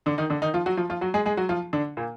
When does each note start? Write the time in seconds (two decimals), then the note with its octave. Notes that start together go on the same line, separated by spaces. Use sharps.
0.06 D3 D4
0.18 D#3 D#4
0.30 D3 D4
0.42 D#3 D#4
0.54 F3 F4
0.66 F#3 F#4
0.77 F3 F4
0.90 F3 F4
1.01 F#3 F#4
1.14 G#3 G#4
1.26 G#3 G#4
1.37 F#3 F#4
1.49 F3 F4
1.73 D3 D4
1.97 A#2 A#3